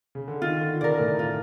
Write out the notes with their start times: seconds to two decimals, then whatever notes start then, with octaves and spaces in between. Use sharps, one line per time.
0.15 C#3
0.28 D3
0.42 D#3 F4
0.61 D3
0.81 C#3 A#4 D5
0.99 A2
1.19 F4